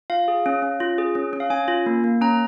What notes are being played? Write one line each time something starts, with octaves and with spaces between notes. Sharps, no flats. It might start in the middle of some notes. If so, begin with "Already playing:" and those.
F4 F5
G#4
C#4
C#4
F4
G#4
C#4
C#4
F5
C#4 G#5
F4
A#3
A#3
C#4 A#5